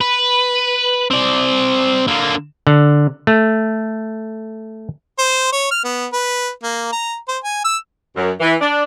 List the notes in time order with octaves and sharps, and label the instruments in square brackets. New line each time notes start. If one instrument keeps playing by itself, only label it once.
[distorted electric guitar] B4
C4 D5
D3 A#3
[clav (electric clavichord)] D3
A3
[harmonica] C5
C#5
F6
B3
B4
A#3
A#5
C5
G#5
E6
[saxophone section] F#2
E3
D4